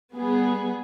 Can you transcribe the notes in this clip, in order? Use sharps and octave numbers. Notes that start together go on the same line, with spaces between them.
G3 B3 G#4